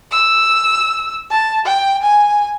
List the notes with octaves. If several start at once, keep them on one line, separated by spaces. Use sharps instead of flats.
E6
A5
G5
G#5